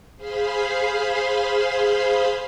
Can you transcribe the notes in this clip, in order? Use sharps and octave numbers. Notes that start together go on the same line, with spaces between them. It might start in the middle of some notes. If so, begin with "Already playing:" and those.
G#4 C5 F5 B5 C6